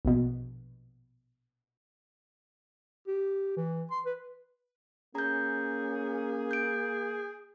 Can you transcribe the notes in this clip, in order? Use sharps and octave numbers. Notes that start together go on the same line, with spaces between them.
A#1 B2
G4
E3
C6
B4
A#3 C#4 G#4 A#5 G6
G6 D7